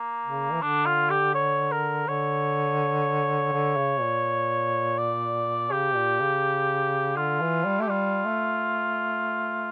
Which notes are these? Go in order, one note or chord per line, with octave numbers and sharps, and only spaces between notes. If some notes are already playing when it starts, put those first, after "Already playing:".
Already playing: A#3
C#3
E3
D3 D4
F4
G4
C#5
A#4
D3 C#5
D3
C#3
A#2
D5
C#3 G4
A#2
C#3
D3 F4
E3
G3
A3 G4
G3 F4
A3